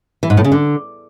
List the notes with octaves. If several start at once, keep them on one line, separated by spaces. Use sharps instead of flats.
E3
G#2
A2
C#3
D3